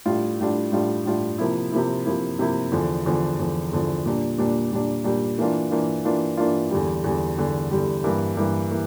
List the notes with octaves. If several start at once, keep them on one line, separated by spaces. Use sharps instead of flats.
A2 G3 D4 F4
A2 G3 D4 F4
A2 G3 D4 F4
A2 G3 D4 F4
C3 F3 A#3 E4
C3 F3 A#3 E4
C3 F3 A#3 E4
C3 F3 A#3 E4
E2 D3 F3
E2 D3 F3
E2 D3 F3
E2 D3 F3
A#2 G3 D4
A#2 G3 D4
A#2 G3 D4
A#2 G3 D4
E3 A#3 D4 F4
E3 A#3 D4 F4
E3 A#3 D4 F4
E3 A#3 D4 F4
E2 D3 G3
E2 D3 G3
E2 D3 G3
E2 D3 G3
G2 E3 A#3
G2 E3 A#3
E3 A#3